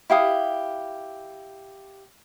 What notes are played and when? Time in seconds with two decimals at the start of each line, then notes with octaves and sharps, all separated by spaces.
0.10 E4 G4 F5 D#6